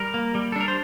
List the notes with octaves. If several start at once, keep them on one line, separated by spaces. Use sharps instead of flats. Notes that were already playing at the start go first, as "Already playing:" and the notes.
Already playing: G3 A#4
A#3
G3
A4
D4 A#4
C5